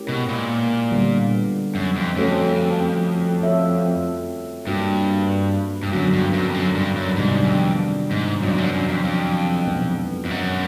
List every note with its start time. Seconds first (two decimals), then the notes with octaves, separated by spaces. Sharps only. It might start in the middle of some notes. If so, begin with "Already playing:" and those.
Already playing: G#3 C#4 E4 G4 A#4
0.08 B2
0.29 A#2
0.92 D3 G3 B3
1.75 F#2
1.96 F2
2.16 F2 A3 C#4 F#4 A4 C5
3.41 C4 F4 A4 C#5 E5
4.66 G2 A#3 D4 F#4 B4
5.83 G2
5.92 F#2 D3 F#3 B3 D4 F#4
6.13 G2
6.33 F#2
6.48 F2
6.54 F#2
6.75 G2
6.96 F#2
7.16 G#2 C3 D#3 G3 B3 D4
7.44 F#2
7.48 F2
8.11 G#2
8.42 G2 F#3 B3 D4 F#4
8.51 F2
8.58 F#2
8.74 F#2
8.89 F2
9.04 F2
9.67 B2 G#3 B3 D#4
10.25 F2
10.30 F#2